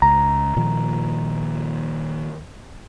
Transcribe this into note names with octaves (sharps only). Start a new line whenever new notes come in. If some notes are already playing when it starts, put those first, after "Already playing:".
C#2 A#5
A#2 D#3 F3